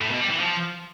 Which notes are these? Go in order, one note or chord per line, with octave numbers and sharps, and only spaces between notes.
A2
B2
G3
E3
F3